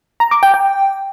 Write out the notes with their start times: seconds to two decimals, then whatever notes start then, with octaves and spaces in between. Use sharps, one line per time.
0.20 A#5
0.31 D6
0.43 G5
0.54 G5